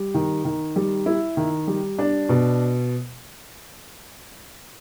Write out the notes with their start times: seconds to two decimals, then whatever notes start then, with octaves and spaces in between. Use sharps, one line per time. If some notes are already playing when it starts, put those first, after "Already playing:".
Already playing: G3
0.14 D#3
0.45 D#3
0.76 G3
1.06 E4
1.37 D#3
1.67 G3
1.99 D4
2.29 B2